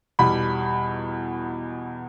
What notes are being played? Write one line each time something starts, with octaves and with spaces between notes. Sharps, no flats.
E2 B2 G3 B5